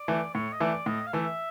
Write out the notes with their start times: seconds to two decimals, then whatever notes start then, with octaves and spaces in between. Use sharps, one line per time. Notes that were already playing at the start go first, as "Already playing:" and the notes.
Already playing: D5
0.08 E3 A3
0.34 A2 C#5
0.52 D#5
0.60 E3 A3 D5
0.86 A2 D#5
1.07 F5
1.13 E3 A3 E5